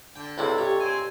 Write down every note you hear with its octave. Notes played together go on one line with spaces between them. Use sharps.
D3 G5
C#2 G2 C3 E4 G#4 A4 B4
G4 C#5
C4 G#5